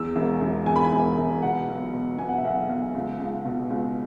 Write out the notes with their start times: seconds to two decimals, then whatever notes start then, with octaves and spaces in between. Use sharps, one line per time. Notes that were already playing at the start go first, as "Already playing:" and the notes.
Already playing: E2 E6
0.16 E1
0.41 E1
0.66 E2 G#5
0.76 B5
0.84 G#5
0.92 E1
1.17 E1
1.42 B2 F#5
1.69 B1
1.94 B2
2.18 B2 G#5
2.29 F#5
2.38 E5
2.45 B1 F#5
2.69 B1
2.95 C#2
3.20 C#2
3.45 B2
3.70 C#2